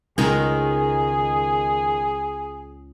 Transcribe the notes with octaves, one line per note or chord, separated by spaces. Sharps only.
C#2 D#3 G#3 G#4